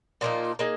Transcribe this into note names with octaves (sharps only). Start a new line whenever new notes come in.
A#2 F3 A#3 D#4
A#3 D#4 G#4